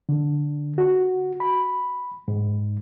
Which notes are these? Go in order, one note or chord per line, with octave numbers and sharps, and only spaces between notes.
D3
F#4
B5
G#2